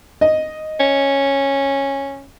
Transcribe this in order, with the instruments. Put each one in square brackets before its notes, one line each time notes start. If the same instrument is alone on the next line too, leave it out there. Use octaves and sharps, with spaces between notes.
[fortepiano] D#5
[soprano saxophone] C#4